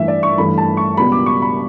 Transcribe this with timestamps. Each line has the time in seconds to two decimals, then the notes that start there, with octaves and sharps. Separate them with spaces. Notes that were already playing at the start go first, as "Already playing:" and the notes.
Already playing: A1 G2 E3 E5
0.08 D5
0.23 C#6
0.37 A1 G2 E3 A3 B5
0.58 A5
0.77 C#6
0.97 C#2 B2 G3 B3 B5
1.12 D6
1.26 C#6
1.42 B5